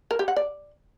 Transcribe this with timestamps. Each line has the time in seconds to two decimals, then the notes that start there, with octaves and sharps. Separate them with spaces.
0.11 A#4
0.19 G4
0.28 F#5
0.36 D5